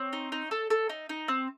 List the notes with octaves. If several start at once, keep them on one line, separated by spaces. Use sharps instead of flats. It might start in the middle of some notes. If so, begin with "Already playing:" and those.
Already playing: C4 C#5
D#4
D#4
A4
A4
D#4
D#4
C4